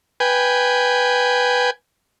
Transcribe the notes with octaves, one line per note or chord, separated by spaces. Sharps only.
B4 G5 G#5